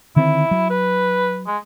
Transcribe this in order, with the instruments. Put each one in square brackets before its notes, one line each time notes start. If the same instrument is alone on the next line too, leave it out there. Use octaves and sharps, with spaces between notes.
[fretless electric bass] D3 D#3 C4 [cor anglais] E4
[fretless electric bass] F#3
[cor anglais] B4
G#3